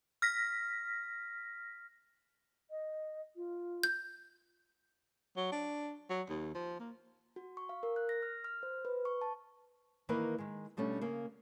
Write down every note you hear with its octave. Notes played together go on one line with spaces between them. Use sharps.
F6 A#6 B6
D#5
F4
G6
F#3
D4
F#3
D#2
F3
A#3
F#4
C#6
F5
A#4
F#6
A#6
F6
F6
C5
B4
C#6
A5
D#3 E3 A#3 A#4 B4
D#3 G#3
B2 G3 A3 C#4 D4
C#3 A#3